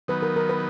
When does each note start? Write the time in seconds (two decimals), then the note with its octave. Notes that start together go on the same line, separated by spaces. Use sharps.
0.08 D#3 F#3 B3 B4
0.22 A#4
0.36 A#4
0.49 B4